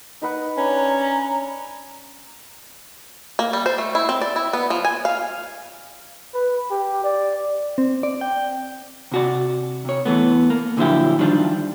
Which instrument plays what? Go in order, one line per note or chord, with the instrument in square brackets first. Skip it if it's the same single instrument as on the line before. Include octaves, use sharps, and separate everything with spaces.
[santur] D#4 B4 F#5
[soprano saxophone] C#4 [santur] D4 B4 [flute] A#5
[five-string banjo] A#3
G3
C5
A3
E4
C4
D5
E4
B3
F3
G#5
F5
[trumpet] B4
G4
D5
[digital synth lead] C4
D5
G5
[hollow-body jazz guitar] C3 F#4 D5
C3 C#5
E3 A3 B3
A#3
A#2 D3 F3 F#3 E4 G4
D#3 F3 G3 D4 F4